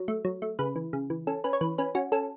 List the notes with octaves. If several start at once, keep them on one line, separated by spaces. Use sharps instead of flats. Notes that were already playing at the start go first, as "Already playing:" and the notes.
Already playing: F#3
A3
F#3
A3
C#3 B4
E3
C#3
E3
C#4 A4
C#4 B4
C#5
E3 B4
C#4 B4
C#4 F#4
C#4 A4